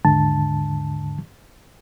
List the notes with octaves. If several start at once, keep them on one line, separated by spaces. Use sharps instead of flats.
D#2 G#2 D3 A5